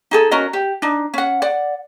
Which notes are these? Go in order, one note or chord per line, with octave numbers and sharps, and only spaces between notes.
D#4 G#4 A4
C#4 F#4 A#4 D#5
G4
D4 D#4
C#4 F#5
D5 F#5